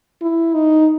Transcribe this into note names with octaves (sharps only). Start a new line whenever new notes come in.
E4
D#4